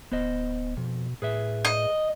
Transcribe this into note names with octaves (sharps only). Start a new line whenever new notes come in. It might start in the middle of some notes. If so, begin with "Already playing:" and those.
D1 B3 C5 D#5
F2 B2
A2 G#4 B4 E5
D#5